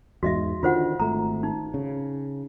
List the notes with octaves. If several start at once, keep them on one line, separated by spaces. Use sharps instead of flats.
E2 G#2 F#4 D#5 E5
D3 D#3 F4 C5 F#5
G#1 A3 A#5
D#4
C#3